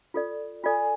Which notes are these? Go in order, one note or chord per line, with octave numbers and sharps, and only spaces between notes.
F4 A4 D5
F4 A4 D5 G#5